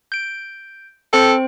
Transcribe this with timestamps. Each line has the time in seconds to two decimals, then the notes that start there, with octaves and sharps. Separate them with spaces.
0.12 G6 D7
1.13 C4 A4 C5 G5